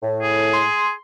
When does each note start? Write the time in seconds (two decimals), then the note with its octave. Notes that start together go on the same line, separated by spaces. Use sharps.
0.02 A2
0.22 G#4
0.53 C6